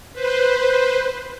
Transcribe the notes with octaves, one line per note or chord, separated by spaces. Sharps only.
B4 C5